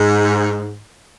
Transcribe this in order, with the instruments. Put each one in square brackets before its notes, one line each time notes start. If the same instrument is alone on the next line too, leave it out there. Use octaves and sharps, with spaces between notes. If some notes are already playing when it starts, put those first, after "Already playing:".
Already playing: [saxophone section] G#2